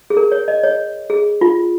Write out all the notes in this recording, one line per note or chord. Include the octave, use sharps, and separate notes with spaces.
G#4
A#4
C#5
D#5
C#5
G#4
F4